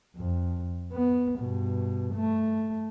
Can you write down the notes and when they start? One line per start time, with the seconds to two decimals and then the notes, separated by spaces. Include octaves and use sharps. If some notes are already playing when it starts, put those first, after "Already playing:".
0.16 F2
0.93 B3
1.38 G2 B2
2.15 A3